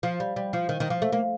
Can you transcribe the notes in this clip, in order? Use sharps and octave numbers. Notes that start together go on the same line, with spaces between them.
F3
G3
G3
F3
D#3
D#3
F3
A3
A#3